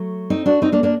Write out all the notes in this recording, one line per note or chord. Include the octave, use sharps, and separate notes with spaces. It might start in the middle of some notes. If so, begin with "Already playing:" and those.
Already playing: F#3 A3
C4 D#4
D4 F#4
C4 D#4
A#3 D4
A#3 D4